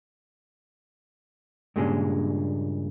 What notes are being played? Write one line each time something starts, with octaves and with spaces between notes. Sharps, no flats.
G2 A#2 C#3 G#3